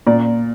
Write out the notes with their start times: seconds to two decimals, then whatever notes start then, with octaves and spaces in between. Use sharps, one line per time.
0.07 A#2 D5